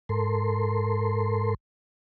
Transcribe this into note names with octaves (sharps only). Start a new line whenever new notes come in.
G#2 A4 A#4 C6